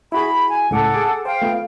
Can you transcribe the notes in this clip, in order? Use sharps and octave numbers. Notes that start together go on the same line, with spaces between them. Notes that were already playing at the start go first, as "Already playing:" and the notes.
E4 F#4 G#4 B5
G#5
C#2 A2 A4 F#5 D6
G#4 D6
C5 F5 G5
A3 B3 F4